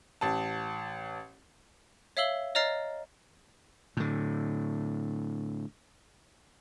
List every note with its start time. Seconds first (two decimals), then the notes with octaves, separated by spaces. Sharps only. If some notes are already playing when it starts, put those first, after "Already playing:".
0.21 A1 A5
2.17 C#5 E5 F5 E6 F#7 G7
2.55 C#5 D#5 A#5 F6 A6 C7
3.97 A2 D3